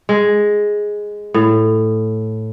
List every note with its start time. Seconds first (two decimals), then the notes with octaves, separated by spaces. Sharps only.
0.09 G#3
1.34 A2